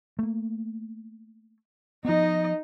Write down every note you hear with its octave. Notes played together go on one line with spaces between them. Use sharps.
A3 A#3
F3 B3 D#4 D#5